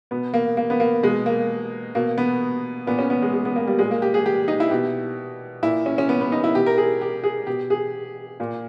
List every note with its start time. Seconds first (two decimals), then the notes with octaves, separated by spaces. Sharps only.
0.11 B2 B3
0.34 A#3
0.57 A#3
0.70 B3
0.80 A#3
1.03 B2 G#3
1.26 A#3
1.95 B2 A#3
2.18 B3
2.87 A#2 B3
2.99 C#4
3.10 B3
3.22 G#3
3.33 G#3
3.45 B3
3.56 A#3
3.67 G3
3.79 A#2 G#3
3.91 A#3
4.02 G4
4.14 G#4
4.26 G4
4.48 D#4
4.60 E4
4.71 B2 G4
5.63 A#2 E4
5.86 C#4
5.98 C#4
6.09 B3
6.21 B3
6.32 D#4
6.44 E4
6.55 B2 G4
6.66 A#4
6.78 G#4
7.01 G4
7.24 G#4
7.47 B2 G4
7.70 G#4
8.40 A#2